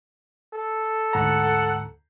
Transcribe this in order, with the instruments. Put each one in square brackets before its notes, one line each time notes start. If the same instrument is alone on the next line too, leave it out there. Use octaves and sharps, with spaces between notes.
[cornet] A4
[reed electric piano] D2 G#2 A#5 [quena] F#5